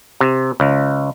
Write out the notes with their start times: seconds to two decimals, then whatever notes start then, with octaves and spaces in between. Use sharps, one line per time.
0.20 C3
0.60 C#2